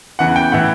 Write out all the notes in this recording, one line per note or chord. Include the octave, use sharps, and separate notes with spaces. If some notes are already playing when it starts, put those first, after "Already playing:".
E2 C#3 E3 F#5
G5
A2 E3 F#5